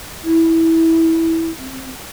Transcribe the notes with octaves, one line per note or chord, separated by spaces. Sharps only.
E4
C4